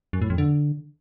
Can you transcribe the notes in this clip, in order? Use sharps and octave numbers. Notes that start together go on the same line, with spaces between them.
F#2
A2
F2
D3